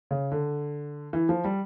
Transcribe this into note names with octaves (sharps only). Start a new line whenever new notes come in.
C#3
D3
E3
F3
G3